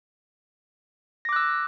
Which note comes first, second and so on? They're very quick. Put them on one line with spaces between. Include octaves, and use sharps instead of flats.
A#6 D6 F#6 E6